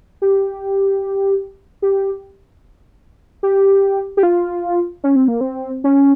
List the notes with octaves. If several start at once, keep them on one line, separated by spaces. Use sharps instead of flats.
G4
G4
G4
G4
F4
C#4
C4
A#3
C4
C#4